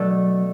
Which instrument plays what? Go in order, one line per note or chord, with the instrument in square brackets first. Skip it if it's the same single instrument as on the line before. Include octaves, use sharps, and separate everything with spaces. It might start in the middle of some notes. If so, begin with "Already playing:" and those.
Already playing: [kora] B2 A3 D4 A4 [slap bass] F#3